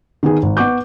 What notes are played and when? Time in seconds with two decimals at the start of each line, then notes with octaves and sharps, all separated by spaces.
0.23 D#3 B3 G#4
0.43 G#1
0.57 B3 F#5 C#6 D6 G6